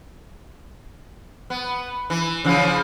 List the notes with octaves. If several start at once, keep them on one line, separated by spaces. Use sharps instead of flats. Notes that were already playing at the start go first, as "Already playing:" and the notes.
B3
E3
C#3 E3 F3